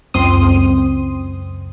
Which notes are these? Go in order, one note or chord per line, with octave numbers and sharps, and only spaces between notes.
C#2 F#2 C4 C6 D#6 D#7